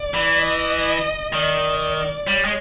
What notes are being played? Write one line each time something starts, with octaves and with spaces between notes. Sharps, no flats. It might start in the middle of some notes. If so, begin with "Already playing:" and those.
Already playing: D5
E3
D#5
D#3 D5
G3 C#5
G#3